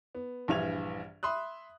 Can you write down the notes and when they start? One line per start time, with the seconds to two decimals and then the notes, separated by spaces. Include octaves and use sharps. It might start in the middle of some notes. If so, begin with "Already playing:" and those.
0.15 B3
0.48 A#1 G2 E3 E5 G#6 F7
1.23 E5 B5 C6 D#6 F#6